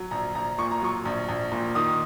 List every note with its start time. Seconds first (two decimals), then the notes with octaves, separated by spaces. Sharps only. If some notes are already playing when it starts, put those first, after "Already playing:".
Already playing: F#3
0.11 A#1 A#5
0.35 A#1 A#5
0.58 A#2 C#6
0.71 A#5
0.82 F#3 C#6
1.05 A#1
1.29 A#1
1.52 A#2
1.75 D#3 D#6